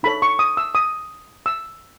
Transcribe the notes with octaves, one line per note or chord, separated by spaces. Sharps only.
D#4 A4 C#5 B5
C#6
D#6
E6
D#6
E6